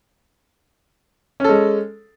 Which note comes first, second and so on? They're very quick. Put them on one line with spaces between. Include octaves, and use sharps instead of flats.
C#4 A4 G#3